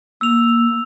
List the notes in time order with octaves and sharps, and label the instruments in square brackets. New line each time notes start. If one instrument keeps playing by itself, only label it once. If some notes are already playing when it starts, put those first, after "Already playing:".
[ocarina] A#3 [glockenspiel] E6 F7